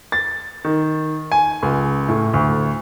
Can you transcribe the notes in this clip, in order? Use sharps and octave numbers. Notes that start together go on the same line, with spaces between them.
A6
D#3
G#5
C#2
A2
D2